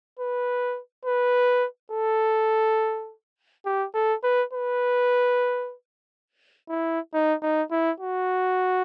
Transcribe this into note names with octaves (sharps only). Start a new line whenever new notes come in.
B4
B4
A4
G4
A4
B4
B4
E4
D#4
D#4
E4
F#4